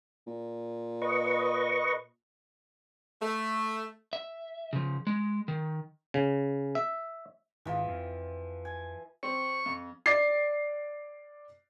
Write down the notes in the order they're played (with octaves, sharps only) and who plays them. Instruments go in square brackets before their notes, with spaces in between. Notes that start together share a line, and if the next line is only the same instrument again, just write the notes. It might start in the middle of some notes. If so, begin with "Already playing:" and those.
[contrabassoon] A#2
[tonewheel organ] B4 D#5 C#6
[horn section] A3
[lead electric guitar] E5
C#3 F3
G#3
D#3
[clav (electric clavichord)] C#3
E5
[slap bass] G#1 [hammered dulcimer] E3 F3
[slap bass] F2
[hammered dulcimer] G#5
[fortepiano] C4 [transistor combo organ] C#6
[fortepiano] F2
[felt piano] D5 D6 A6 C7